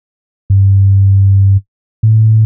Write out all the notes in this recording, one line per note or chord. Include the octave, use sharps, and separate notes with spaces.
G2
A2